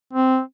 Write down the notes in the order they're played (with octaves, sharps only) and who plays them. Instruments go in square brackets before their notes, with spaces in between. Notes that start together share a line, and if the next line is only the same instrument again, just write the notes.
[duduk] C4